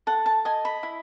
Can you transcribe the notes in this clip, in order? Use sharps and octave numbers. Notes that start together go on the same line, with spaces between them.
A4 F#5
A5
D#5 G#5
B5
E4